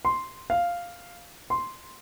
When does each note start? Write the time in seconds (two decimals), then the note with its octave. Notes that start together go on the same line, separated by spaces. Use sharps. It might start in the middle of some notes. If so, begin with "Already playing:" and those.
0.05 C6
0.50 F5
1.50 C6